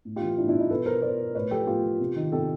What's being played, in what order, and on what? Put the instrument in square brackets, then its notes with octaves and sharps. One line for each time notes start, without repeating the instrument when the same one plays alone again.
[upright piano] A2
F4 G4
E3
A2 D4 E4
D4 E4
E3 D#4 F4
B2 A4 B4
A#4 C5
B2 C5 D5
A2 B4 C#5
F3 G4 A4
A2 F4 G4
F3
C3
D#3
C3 G4 A4